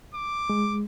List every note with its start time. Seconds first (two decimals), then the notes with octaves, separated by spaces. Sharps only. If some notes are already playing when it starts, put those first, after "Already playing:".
0.15 D6
0.50 G#3